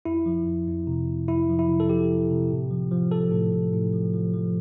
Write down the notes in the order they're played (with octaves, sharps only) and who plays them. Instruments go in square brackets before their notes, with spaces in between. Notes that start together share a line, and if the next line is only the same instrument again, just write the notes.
[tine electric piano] F2 E4
F3
F2
F2
C3
C3
F2 E4
F3
E4
C3
A4
F3 G4
C3
C3
A2
F3
F3
F3 A4
A2
A2
A2
F3
F3
F3